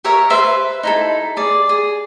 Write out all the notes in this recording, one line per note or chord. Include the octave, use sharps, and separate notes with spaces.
G4 A#4 C#5 E5
B4 C5 E5
D#4 E4 A4
G#4 D5
G#4